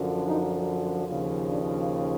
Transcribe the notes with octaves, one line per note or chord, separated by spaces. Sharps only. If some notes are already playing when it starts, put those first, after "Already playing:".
Already playing: F#2 D3 F3
D#4
D#2 C#3 F3
D4